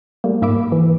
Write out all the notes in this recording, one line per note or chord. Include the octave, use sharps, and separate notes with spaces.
G3 A3 A#3
G#2 A#3 E5 B5 D6
E3